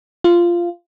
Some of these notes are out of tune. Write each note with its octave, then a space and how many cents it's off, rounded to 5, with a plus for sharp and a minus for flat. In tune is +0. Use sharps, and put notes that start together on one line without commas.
F4 -10